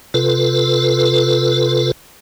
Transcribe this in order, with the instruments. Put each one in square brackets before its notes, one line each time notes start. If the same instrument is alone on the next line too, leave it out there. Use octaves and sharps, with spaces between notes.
[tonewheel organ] C3 F4 A4 B4